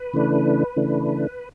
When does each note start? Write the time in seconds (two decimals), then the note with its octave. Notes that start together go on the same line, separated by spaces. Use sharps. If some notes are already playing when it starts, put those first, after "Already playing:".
Already playing: B4
0.14 C#3 E3 A3 D4
0.77 C#3 E3 A3 D4